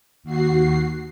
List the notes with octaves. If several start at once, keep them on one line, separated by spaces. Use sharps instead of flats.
D#2 F#4 C7